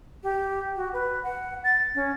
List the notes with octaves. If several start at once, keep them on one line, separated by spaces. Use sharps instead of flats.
G4
F#4
B4
F#5
A6
C#4